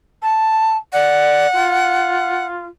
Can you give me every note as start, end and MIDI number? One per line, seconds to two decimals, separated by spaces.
0.22 0.77 81
0.93 1.46 74
0.93 2.46 78
1.53 2.66 65